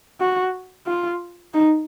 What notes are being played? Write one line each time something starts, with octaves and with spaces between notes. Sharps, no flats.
F#4
F4
D#4